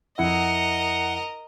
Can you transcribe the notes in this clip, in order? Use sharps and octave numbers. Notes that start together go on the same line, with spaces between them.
F2 E4 A#4 D#5 E5 F#5